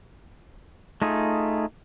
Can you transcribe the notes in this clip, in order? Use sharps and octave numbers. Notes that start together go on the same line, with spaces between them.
A3 D#4 F4 G#4